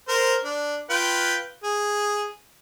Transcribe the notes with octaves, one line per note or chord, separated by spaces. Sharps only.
A#4 C5
D4
F4 B4 G5
G#4